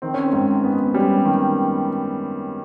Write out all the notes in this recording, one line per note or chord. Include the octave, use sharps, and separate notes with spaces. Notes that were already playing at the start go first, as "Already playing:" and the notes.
D#3 C4
C#4
C4
G#2
B3
G3 C#4
D#3